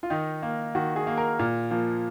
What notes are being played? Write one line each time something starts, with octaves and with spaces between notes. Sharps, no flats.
F4
D#3 D#4
A#3
D#3 F#4
G#4
A#3
A#4
A#2
F3 A#3